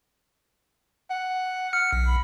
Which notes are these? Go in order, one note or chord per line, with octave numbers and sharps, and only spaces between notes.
F#5
F6 C#7
B1
B5